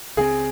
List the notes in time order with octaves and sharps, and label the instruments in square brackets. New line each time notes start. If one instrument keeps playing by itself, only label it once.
[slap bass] C#2 C#3 F#3 C4 [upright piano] G#4